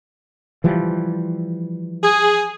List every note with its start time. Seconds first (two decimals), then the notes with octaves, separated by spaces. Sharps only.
0.64 E3 F3 G3
2.04 G#4